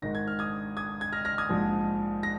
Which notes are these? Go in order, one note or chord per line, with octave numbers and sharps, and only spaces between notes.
G#1 G#2 D#3 A#6
G#6
F6
D#6 G#6
D#6 G#6
G#6
F6 A#6
F6 A#6
D#6 G#6
A#1 G#2 F3
A#6